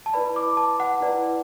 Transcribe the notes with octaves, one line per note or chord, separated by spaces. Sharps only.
A5
E4 B4 D5 B5
D6
A5
F#5
E4 B4 D5